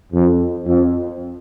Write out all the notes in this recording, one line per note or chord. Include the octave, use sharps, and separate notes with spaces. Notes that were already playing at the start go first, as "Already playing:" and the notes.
F2
F2